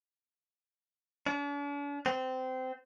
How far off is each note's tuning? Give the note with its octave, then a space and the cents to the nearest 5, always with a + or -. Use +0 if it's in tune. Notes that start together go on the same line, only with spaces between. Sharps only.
D4 -45
C4 -20